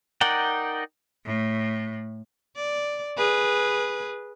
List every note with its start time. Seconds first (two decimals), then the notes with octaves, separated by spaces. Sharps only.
0.21 D#4 A#4 D5 F#5 G5
1.25 A2
2.56 D5
3.17 G#4 B4